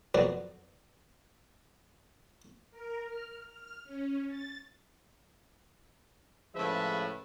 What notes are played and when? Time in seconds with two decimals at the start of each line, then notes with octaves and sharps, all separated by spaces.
0.15 F2 F#3 B3 B4 D5
2.71 A#4
3.06 F6
3.52 F6
3.84 C#4
4.28 A6
6.55 A2 C#3 F3 G#3 B4 E5